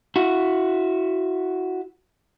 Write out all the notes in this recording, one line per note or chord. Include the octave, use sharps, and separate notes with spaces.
E4 F#4